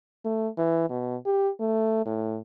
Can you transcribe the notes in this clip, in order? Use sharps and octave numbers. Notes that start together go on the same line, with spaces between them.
A3
E3
B2
G4
A3
A2